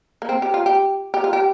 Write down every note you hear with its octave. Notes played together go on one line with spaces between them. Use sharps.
A#3
C4
G4
F4
G4
G4
F4
G4